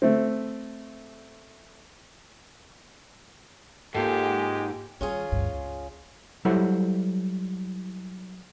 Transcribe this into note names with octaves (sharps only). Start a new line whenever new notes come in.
A3 C4
G#2 G#3 A#3 F4 G4 A4
D#3 G3 C#4 F4 G#4
D2 G2
C#2
F#3 G3 E4 A4 C5 F#5